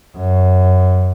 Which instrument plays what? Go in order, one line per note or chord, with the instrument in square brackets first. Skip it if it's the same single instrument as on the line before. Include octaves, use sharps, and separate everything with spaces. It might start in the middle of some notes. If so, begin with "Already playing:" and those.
[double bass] F#2